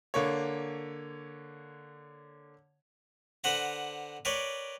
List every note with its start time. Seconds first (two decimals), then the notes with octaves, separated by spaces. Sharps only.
0.14 D3 A#3 C#5
3.44 D3 B4 C5 F#5 A#5
4.25 A#4 B4 C#5 D5 G5